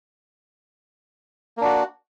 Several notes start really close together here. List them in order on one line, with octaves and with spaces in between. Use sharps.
A#3 D4 F#4